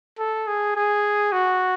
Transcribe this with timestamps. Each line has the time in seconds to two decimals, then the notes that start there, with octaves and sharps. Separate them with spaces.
0.19 A4
0.47 G#4
0.76 G#4
1.32 F#4